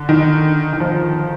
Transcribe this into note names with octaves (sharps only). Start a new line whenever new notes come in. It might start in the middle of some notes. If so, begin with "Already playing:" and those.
Already playing: D3
D#3
D#3
F3